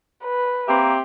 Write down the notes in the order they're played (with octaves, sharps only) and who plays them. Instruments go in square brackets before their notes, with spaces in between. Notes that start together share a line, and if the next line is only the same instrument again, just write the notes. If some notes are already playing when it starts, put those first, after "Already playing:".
[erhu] B4
[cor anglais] A#3 [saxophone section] C4 G4 E5